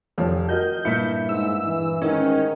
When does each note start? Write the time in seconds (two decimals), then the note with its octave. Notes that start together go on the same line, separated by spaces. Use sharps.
0.18 F1 F3 C#5
0.49 F#4 A#4 D#5 G6
0.85 G2 A#2 E4 B6 C#7
1.29 G#2 E6
1.66 E3
2.02 A1 G#2 D#3 C#4 D#4